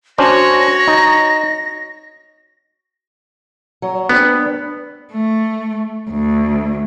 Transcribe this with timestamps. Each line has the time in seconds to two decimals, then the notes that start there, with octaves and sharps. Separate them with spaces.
0.18 C#4 D4 F#4 C5 C#5 A#6
0.87 D#4
3.82 F#3
4.09 B3 C4 D4 B4
5.13 A3
6.11 D2